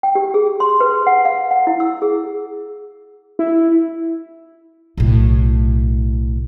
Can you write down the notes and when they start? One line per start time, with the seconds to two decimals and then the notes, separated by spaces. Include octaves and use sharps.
0.03 G5
0.15 G4
0.34 G#4
0.60 C6
0.80 B4
1.07 F#5
1.25 F5
1.51 F#5
1.67 E4
1.80 E6
2.02 G#4
3.39 E4
4.97 B1 A2